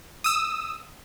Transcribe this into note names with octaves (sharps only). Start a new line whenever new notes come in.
D#6 E6